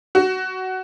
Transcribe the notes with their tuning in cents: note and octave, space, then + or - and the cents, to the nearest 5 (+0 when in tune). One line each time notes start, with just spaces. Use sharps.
F#4 +15